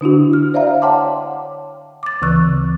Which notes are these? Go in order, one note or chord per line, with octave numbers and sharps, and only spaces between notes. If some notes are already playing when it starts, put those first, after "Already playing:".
D3 D4 E4 F#4
F6
C5 D5 E5 F5 A#5
C#5 F#5 G5 A5 C6 D6
D6 A6
D2 C#3 E3 C#6 E6 F#6